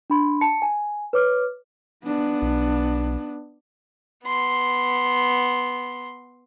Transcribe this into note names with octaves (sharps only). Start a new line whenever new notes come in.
D4 B5 C6
A5 C#7
G#5
B4 C#5 D6 F6
B3 D4
B1
B3 C6